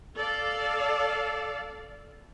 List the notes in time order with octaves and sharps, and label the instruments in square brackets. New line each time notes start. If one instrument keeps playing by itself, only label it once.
[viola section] A4 D5 F5